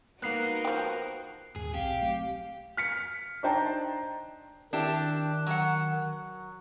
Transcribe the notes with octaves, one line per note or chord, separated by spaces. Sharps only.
A#3 B3 D#4 F#4 A#4 F#6 C7
F3 G4
D#1 D#2 G#2 G#4
B1 C4 G4 F5
F#3 A3 C4
F6 B6 C#7
D4 D#4 C5 G5 A5 A#5
D#3 D4 E4 G4 F#6
F#3 F#5